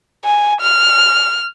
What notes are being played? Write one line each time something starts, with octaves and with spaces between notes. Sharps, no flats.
G#5
F6